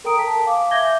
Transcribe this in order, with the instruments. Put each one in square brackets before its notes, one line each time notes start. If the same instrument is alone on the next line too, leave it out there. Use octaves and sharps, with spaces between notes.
[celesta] A4 A#4 G5 A#5 D#6 D7
A5 B6
F5 G#5 D6
E5 D6 G6 G#6 A#6 G7